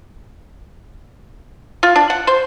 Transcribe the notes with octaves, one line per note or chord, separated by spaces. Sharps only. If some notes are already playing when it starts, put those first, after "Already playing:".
F4
D4
F#5
C5